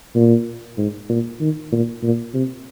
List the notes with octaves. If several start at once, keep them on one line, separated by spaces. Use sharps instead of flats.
A#2
G#2
A#2
D#3
A#2
A#2
C3